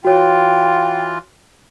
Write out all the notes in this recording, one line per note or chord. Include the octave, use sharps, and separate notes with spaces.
E3 F4 F#4 C#5 G5